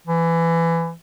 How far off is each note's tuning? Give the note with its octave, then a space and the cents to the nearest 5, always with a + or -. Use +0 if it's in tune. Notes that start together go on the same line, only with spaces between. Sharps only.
E3 +20